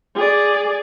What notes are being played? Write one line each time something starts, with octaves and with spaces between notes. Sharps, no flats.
G#4 D5